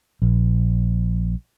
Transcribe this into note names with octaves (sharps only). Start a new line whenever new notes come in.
A#1